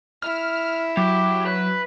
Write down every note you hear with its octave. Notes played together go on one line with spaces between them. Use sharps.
E4 F6
F#3 G4
B4